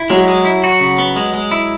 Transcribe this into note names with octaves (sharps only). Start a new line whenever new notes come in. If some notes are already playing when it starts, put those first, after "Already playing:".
Already playing: E4
F#3 G#3
G#3
E4
F#4
C#3
B3
G#3
G#3
E4